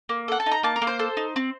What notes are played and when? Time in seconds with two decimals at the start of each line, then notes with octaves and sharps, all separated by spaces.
0.09 A#3
0.28 A4 F#5
0.40 A5
0.46 D#4
0.51 A#5
0.63 A#3 A5
0.76 A#4
0.82 A#3
0.87 C5
0.99 A4
1.17 D#4
1.36 C4